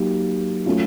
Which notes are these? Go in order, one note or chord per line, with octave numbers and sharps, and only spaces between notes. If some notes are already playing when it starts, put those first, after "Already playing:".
Already playing: F#3 A#3 D#4 G4
F#3 A3 C#4 F4